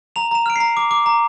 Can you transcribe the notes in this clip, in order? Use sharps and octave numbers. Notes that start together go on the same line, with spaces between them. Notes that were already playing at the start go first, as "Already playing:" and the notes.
A#5 F7
A#5 E7
F6 D7
A#5 C7
D6
D6
A#5